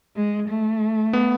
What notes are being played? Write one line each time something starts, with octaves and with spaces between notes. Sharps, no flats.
G#3
A3
B3